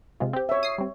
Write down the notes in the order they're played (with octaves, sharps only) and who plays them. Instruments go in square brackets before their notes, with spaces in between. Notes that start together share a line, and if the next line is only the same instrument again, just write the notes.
[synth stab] C3 G#3 F4
C4 G4
[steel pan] C#5 E5
[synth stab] D#6 C7
G3 C4